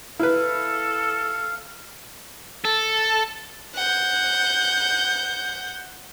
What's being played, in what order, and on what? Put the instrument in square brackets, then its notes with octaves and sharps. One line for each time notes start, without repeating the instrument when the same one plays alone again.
[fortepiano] E4 B4 [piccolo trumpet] A4 [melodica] F5
[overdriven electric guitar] A4
[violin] F#5 G6